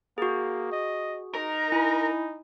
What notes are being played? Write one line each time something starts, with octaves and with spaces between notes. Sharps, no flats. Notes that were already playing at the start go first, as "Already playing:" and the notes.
A#3 F#4 G#4
D#5
D#4 A#4
E4 G#5